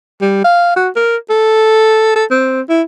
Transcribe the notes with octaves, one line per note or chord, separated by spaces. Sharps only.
G3
F5
F#4
A#4
A4
A4
C4
E4